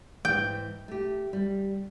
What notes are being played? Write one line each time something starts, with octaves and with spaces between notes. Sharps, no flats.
G#2 E3 G5
A3 G4
G3